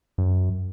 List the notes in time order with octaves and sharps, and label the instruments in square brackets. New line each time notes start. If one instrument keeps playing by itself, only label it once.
[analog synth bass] F#2